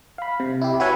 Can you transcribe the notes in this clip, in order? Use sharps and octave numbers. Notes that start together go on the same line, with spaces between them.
F5 B5
C3
E4 G4
F#4 B4 C#5 E5 F#5 G#5